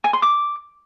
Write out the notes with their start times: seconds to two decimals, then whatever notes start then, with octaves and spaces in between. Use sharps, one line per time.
0.04 G#5
0.13 C6
0.22 D6